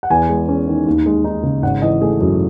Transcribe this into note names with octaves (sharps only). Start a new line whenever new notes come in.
F#5
E2 G#5
G#3
C#4
D#3
D#2
G#3
D#4
C#3
G#1 F#5
E3 D#5
A3 G#4
F#2 F#4